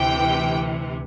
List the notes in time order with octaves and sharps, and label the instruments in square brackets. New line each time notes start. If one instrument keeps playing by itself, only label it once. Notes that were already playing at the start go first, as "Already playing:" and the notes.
Already playing: [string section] D2 C3 E3 G5